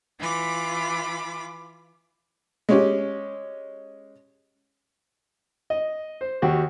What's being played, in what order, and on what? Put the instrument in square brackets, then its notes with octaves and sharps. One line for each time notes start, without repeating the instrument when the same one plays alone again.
[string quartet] E3 F4 B5 D6
[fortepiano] G#3 C#4 G4
D#5
C5
D#2 F#4 G4